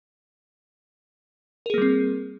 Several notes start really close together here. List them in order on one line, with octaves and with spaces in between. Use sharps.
A#4 G#4 A#3 G3 C4